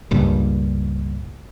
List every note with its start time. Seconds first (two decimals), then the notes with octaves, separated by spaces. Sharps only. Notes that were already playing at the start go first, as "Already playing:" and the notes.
0.11 C#2 G2 A#2